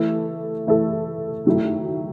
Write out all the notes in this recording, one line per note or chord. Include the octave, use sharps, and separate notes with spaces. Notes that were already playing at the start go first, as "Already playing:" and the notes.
Already playing: E3 A3 E4 A4
E3 A3 E4 A4
D#3 F#3 A3 E4